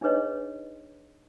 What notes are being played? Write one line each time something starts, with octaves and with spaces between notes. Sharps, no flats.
D4 D#4 G#4 B4 C#5 D#5